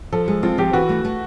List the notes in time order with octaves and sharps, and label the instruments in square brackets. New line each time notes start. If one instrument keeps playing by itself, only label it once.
[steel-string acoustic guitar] F3 [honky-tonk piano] A4
[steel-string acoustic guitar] G#3
[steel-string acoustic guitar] C4 [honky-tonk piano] F4
[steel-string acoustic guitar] F3 [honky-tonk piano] G4
[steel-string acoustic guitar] E3 [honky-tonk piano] F#4
[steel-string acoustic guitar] A3
A3